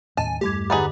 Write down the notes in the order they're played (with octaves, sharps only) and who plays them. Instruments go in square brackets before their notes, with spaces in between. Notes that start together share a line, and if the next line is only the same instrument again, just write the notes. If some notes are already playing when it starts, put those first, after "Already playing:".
[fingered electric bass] D#2 A2 C#4 [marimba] D#5 [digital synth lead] G#5 [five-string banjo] A5
[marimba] E2 G2 G#6 [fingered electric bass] G3 A3 [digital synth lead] G4
[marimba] D3 A6 [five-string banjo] B3 D#4 G#4